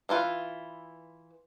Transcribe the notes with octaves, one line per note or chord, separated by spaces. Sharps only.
E3 E4 F4 B4